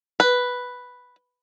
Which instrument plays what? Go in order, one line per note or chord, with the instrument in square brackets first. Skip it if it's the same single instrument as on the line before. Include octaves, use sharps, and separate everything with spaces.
[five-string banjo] B4